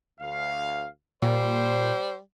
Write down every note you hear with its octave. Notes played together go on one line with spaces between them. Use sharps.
D2 F5
A#2 G3 C5